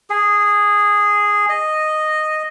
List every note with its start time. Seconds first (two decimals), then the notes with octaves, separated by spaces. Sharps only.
0.10 G#4
1.49 D#5